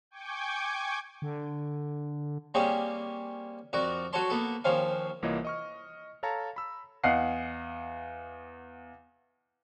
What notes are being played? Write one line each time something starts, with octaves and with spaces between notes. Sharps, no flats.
G5 G#5 C#6 D6 G6 G#6
D3
G3 A#3 C4 C#4 G4 G#4
F2 F#4 A#4 D5
F#3 F#4 A4 C#5 A5 C6
A#3 B3 A4
D#2 F3 C4 C#4 F5
C2 E3 A#3 F4 C#5 D#5
D#5 C#6 F6
A4 C#5 F5 A5 A#5
B5 E6
E2 D#5 F5 F#5 C7